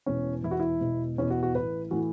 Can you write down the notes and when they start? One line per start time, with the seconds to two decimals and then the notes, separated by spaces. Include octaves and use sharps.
0.06 E1 E2 E3 C#4
0.43 E1 E2 E3 E4
0.51 F#4
0.60 E4
0.81 E1 E2 B2
1.17 E1 E2 B2 C#4
1.30 F#4
1.43 F#4
1.55 A1 A2 E3 B4
1.91 A2 E3 F#4